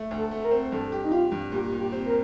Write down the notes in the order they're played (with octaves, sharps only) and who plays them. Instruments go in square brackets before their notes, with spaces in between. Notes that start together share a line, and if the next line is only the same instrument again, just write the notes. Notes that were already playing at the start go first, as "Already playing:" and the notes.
Already playing: [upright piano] A3
D2
[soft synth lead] A4
[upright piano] A3
[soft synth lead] A4
A#4
[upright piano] C4
[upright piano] G2 [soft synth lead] A4
[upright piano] G4
[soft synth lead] D#4
[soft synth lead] F4 [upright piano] G4
[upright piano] G2
[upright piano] A#2 [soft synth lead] G4
[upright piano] A#2
[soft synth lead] G4
[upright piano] C4
[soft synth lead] A#4